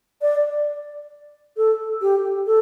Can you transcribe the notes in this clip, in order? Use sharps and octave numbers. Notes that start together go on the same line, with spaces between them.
D5
A4
G4
A4